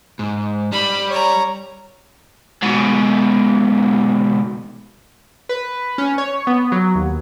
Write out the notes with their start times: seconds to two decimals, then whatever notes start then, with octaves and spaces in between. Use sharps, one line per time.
0.19 G#2
0.72 G3 B5
1.10 C#5 A#5
2.63 G#2 B2
5.49 B4
5.98 C#4
6.18 C#5
6.47 B3
6.72 F#3
6.95 D#2